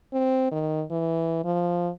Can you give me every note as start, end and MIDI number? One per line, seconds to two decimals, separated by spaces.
0.13 0.48 60
0.51 0.84 51
0.90 1.42 52
1.45 1.90 53